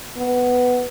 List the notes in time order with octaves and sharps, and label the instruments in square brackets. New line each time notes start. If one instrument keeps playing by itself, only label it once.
[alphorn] B3